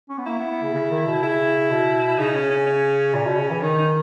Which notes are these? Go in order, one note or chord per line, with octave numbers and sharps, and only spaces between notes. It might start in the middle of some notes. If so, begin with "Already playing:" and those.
C#4
B3
A#3 E4
B3
B3
C#3
C#3
D#3
B2
C#3 E4
B2
C#3 D#4
C#4
C#4
C#4
A#2
B2
C#3
E3
D#3 D#4
D#4